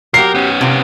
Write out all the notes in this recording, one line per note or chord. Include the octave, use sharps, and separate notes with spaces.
F#3 G4 A#4 C7
B3 C#4
C3 F4